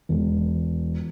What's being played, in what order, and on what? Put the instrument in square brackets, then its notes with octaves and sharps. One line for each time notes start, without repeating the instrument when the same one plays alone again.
[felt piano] E1